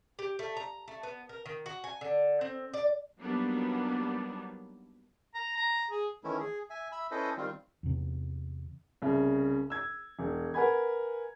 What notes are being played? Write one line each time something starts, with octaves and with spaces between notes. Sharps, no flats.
G4
A3
A#5
A3
B3
A#4
D#3
F#4
G#5
D3
C4
D5
F#3 G3 A#3 B3 D4 D#4
A#5
A#5
G#4
D#3 E3 A3 C#4 E4
G#4
E5 G#5
E5 B5 E6
C#4 E4 A4 B4 C5 D#5
D#3 G3 C4 F4
E2 C3
C2 C#3
E6 G#6
E1
A#4 B4 F#5 G#5 B5 G#6